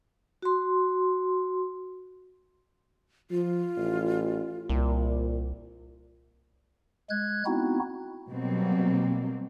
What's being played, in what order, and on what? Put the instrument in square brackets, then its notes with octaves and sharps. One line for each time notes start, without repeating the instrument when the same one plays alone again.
[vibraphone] F#4 C6
[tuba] F3 [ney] F4
[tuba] A1
[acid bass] C2 [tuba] A#2
[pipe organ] G#3 F#6 G#6
B3 C4 D#4 E4 F#4
[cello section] B2 F#3 G3 A#3 C4